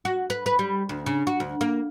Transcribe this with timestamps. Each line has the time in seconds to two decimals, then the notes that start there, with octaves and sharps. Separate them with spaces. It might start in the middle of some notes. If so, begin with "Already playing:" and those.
0.05 F#4
0.30 B4
0.46 B4
0.59 G3
0.89 D2
1.06 C#3
1.27 F#4
1.40 D2
1.61 A#3